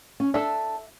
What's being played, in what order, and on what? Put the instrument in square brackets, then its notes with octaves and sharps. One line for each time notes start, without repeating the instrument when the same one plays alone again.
[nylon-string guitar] C#4
[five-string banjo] D4 A4 [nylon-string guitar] E5